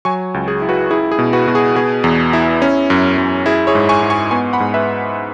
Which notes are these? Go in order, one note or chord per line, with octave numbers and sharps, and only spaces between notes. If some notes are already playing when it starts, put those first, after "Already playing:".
F#3 G#5 C#6
C#2
G#4
E4
F#4 B4
E4 G#4
G#4
B2
F#4 B4
B2
G#4
B3 G#4
E2
E4
C#4
F#2
F#2
E4 G#4
G#4 C#5
G#2
G#5 C#6
G#2
G#5 C#6
B3 G#5 C#6
F#5 B5
G#2
B4 E5